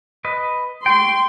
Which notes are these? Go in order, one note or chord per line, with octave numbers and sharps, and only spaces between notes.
B4 D#5
G5 C6 C#6